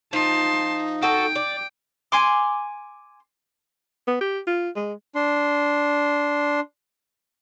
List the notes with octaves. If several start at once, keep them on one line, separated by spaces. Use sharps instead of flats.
F3 D#4 A5 C6
F#4 A4 G5
D5
G#5 C6 D6
B3
G4
F4
G#3
D4 C6